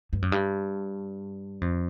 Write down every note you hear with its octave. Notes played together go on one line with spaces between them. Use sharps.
G2
F#2
G2
F2